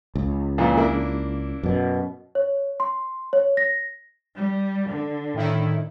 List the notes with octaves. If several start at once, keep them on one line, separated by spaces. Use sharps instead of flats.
C#2
F2 A#2 E3
A#3 D4 E4
F#2 B2
C#5
C6
C#5
A#6
G3
D3
A2 D#3 E4